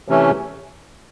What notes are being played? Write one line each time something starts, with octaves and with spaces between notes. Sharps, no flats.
C3 E3 A3 C#4